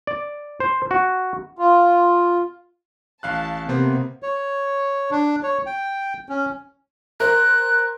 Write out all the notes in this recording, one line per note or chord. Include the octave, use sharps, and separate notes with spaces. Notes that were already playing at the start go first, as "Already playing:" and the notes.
D5
C5
F#4
F4
A1 F5 A5 F#6
C3 A#3 B3 C5
C#5
D4
C#5
G5
C#4
A#4 C5 F#6